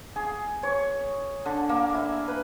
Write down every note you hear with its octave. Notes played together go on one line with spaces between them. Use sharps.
G#4
C#5
D3
A#3
E4
B4